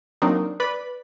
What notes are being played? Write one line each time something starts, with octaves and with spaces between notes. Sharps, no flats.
F#3 A#3 C4 D4 D#4
B4 D5 B5